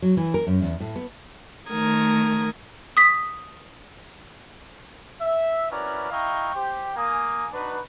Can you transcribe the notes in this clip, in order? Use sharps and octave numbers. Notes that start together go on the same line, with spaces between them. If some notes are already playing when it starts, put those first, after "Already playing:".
F#3
E3
A#4
F#2
E2
A2
B3
D#3 A3 A#4 D#6 G#6
D#6 B6
E5
C#4 E4 F#4 A#4 B4 D5
E4 D#5 F5 G5 A#5 C#6
G4 C5 G5
A#3 G#5 D#6
D4 D#4 F#4 B4